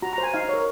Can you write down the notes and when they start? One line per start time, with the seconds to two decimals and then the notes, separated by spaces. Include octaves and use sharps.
0.02 F#4 A#5
0.13 A#5
0.18 C5
0.23 G#5
0.34 D#4 F5
0.49 A#4 C#5